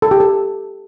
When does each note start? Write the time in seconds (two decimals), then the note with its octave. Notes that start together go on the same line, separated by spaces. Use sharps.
0.02 A4
0.11 G4
0.20 A4